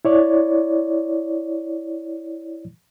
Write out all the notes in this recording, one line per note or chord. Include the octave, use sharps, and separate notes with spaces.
E4 C#5 D5